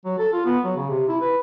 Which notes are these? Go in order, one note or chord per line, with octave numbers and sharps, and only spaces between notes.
F#3
A4
F4
B3
F#3
C#3
C3
E4
B4